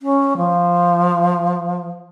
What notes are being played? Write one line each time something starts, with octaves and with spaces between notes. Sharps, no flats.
C#4
F3